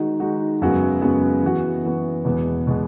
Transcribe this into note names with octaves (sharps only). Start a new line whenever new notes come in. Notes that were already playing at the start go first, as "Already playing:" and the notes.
Already playing: D#3 G#3 D#4 F#4
D#3 G#3 D#4 F#4
F#2 C#3 G#3 B3 F#4
F#2 C#3 G#3 B3 F#4
E3 B3 F#4
E3 B3 F#4
E2 B2 G#3 B3
B2 G#3 B3